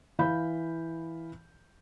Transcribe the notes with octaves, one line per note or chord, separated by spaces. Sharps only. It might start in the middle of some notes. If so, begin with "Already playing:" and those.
E3 F5 B5 G6